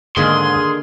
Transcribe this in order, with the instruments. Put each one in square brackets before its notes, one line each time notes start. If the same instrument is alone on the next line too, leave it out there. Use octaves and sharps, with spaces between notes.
[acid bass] G#2 [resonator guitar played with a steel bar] D3 D#3 A#3 [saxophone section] G#4 [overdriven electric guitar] C6